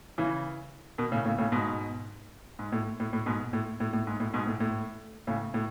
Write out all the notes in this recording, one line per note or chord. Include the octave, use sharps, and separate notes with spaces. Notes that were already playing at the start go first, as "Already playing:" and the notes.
C#3 E3
B2 D#3
A2 C#3
A2 C#3
A2 C#3
G#2 B2
G#2
A2
A2
A2
G#2 B2
A2
A2
A2
G#2
A2
G#2 B2
A2
A2
A2 C#3
A2